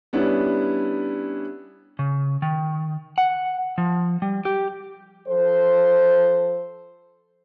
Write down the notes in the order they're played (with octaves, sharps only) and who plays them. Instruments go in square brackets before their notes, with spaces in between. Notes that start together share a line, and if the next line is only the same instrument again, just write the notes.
[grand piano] G3 B3 C#4 D4 E4
[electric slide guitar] C#3
D#3
F#5
F3
G3
G4
[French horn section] F3 A4 C5